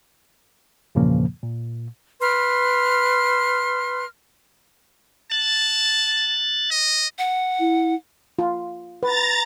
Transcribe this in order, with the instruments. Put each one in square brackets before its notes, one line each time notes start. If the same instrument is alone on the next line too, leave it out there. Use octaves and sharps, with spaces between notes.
[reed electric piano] E2 G2 A#2 C#3 F3 A#3
A#2
[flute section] B4 C6 F6
[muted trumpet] A5 [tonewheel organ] F#6 A6
[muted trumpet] D#5
[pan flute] F#5
[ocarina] E4
[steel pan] F4
[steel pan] B4 [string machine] A#5 A6